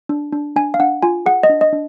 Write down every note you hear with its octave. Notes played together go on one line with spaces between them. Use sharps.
D4
D4
D4 G#5
F5
D4 F#5
F4 G#5
G#4 F#5
D#5
D4
D#5
D4